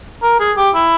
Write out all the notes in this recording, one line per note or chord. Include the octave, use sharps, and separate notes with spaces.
A#4
G#4
G4
E4